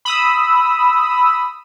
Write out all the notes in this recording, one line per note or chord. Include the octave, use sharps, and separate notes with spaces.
B5 D#6 E6